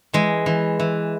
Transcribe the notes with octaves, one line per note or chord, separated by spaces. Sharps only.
E3 G#3
E3
E3